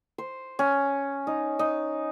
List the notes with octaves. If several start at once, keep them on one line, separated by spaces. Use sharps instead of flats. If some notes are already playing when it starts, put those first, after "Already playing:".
C5
C#4
D#4
D#4